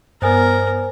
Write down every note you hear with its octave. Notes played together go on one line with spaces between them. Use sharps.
G2 B3 A#4 C5 G#5